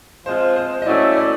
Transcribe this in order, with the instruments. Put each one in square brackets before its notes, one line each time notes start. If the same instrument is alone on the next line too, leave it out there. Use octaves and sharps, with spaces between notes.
[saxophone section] F3 G#3 C4 F4 [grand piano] C5
[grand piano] C5
D#5
[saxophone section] F#3 A3 C#4 E4 [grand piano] D5
[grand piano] D5